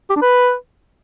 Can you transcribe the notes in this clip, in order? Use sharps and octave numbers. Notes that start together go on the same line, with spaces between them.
G4
D4
B4